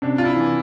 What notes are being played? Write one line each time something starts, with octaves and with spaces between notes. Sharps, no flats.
C3 D4
F4
E4
E3